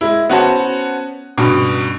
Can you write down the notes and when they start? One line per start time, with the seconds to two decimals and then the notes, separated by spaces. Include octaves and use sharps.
0.01 G#3 E4
0.30 B3 C#4 F#4 C5 F#5 A5
1.38 C#2 G2 B2